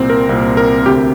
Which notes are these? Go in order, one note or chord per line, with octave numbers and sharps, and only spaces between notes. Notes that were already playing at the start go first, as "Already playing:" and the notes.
Already playing: C2 A#2 C4
A#4
C2 A#2
A#4
D2 C3 G4